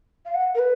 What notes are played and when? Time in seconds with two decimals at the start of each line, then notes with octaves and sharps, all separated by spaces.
0.26 F5
0.34 F#5
0.55 A#4
0.59 B4